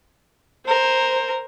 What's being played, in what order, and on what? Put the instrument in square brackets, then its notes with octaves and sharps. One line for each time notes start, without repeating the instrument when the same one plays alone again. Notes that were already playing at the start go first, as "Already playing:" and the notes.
[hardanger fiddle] A#4 [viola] C5